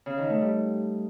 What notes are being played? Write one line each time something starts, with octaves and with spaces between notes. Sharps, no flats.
C#3
D#3
A3
G3